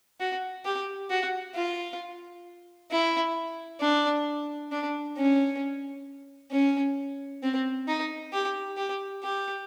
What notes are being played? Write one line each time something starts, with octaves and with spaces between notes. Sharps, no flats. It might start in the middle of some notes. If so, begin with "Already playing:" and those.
F#4
G4
F#4
F4
E4
D4
D4
C#4
C#4
C4
D#4
G4
G4
G4